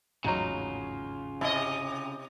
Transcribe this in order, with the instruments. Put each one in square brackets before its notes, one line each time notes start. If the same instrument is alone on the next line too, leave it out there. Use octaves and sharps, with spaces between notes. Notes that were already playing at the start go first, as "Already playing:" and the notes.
[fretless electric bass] G#1 E2 A2 [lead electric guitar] C#3 F4 [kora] F#3 D#4 F#4
[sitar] C3 D#5 [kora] E4